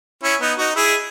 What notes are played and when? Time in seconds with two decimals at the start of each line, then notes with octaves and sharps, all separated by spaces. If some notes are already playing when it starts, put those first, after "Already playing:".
0.23 C#4 E4
0.41 B3 D#4
0.58 D#4 F#4
0.76 E4 G#4